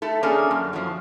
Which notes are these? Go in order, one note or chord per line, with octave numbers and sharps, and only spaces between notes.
A3 A4
A#3 C#4 D4 G#4 A4
F#2
F3 F#3